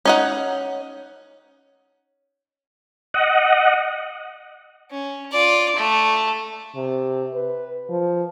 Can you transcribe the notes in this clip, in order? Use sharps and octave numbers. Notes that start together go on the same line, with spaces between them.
C#4 D#4 F#5
D#5 F#5
C#4
F4 D5
A3
C3
B4
F3